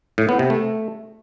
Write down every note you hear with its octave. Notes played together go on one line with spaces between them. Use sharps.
A2
B3
C3
A3